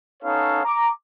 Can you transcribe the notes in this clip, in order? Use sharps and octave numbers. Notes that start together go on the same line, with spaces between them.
B3 C#4 D#4 A4 C#5 F5
A#5 D6